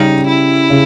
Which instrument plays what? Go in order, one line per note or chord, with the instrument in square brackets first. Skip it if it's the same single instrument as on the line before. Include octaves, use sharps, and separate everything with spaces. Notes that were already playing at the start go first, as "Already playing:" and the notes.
Already playing: [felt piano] C#3 G3 C#4 [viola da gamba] D#4
[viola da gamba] E4
[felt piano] C#3